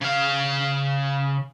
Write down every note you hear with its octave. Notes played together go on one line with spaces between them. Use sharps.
C#3 F5